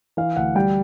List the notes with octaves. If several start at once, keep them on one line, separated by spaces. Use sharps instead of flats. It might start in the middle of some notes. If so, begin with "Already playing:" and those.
E3 F5
D2 F#5
G3 G5